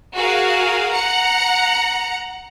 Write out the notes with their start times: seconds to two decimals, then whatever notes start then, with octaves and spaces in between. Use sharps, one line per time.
0.14 F#4 G#4 A#4 F5
0.92 F#5 A#5 C#7